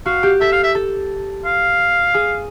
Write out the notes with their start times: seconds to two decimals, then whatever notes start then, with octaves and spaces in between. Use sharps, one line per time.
0.06 F#4 F5
0.23 G4
0.41 A4 E5
0.52 F5
0.63 E5
0.75 A4
1.45 F5
2.14 G#4